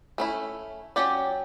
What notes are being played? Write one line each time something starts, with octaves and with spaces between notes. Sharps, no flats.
A3 C#4 E4
F#3 C#4 G4 D5